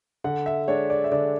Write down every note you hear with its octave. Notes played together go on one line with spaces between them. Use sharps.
D3 F#5
E5
G#3 D4 C#5
D5
E5
D3 D5